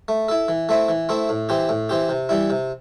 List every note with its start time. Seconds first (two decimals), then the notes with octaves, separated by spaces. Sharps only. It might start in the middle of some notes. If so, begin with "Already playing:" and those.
0.08 A3
0.28 E4 A4
0.48 E3
0.69 A3 C4 E4
0.89 E3
1.09 A3 C4 E4
1.29 A2
1.49 E3 C4 G4
1.69 A2
1.89 E3 C4 G4
2.09 C3
2.29 E3 G3 E4
2.50 C3